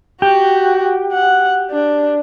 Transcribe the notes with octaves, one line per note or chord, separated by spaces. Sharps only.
F#4 G4
F#5
D4